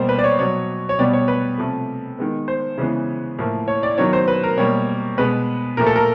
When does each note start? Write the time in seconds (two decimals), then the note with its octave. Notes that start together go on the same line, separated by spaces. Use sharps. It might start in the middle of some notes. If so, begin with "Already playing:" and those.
Already playing: B2 G3 A#3 C5
0.09 B4
0.19 D5
0.24 C#5
0.38 B2 F#3 B3 C#5
0.89 C#5
0.99 B2 G3 B3 D5
1.13 C#5
1.28 B4
1.58 C3 F3 A3
2.19 D#3 G#3 B3
2.48 C5
2.78 C#3 E3 G#3 B3
3.39 A2 F3 A#3
3.68 C#5
3.83 D5
3.98 D#3 F#3 B3 C#5
4.13 C5
4.28 B4
4.43 A#4
4.57 B2 G3 A#3 C#5
5.18 B2 G#3 B3 B4
5.77 A#2 F3 A3 A#4
5.87 A4
5.96 A#4